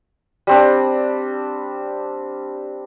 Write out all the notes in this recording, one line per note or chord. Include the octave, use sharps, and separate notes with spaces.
G3 C4 D4